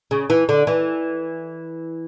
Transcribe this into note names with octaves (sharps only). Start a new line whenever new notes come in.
C#3
E3
D3
E3